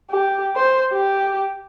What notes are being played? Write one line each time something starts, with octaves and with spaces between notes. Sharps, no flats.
G4
C5
G4